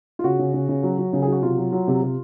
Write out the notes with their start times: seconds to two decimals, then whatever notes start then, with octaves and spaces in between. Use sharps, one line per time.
0.19 F4
0.24 C#3 F#4
0.39 C#3
0.54 C#3
0.69 C#3
0.83 F#3
0.98 F#3
1.13 C#3
1.22 G#4
1.27 F#3 F#4
1.42 C3 F4
1.58 F#3
1.72 F#3
1.88 C3
2.02 C3